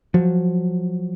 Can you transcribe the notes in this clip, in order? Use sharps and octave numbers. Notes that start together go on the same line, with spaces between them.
F3 F#3